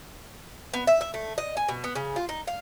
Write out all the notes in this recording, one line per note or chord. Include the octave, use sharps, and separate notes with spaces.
B3
E5
E5
A3
D#5
G#5
B2
B3
C#3
F4
D#4
F5